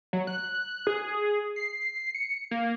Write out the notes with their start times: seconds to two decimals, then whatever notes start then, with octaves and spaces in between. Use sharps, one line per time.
0.13 F#3
0.27 F#6
0.87 G#4
1.56 C7
2.14 C#7
2.51 A#3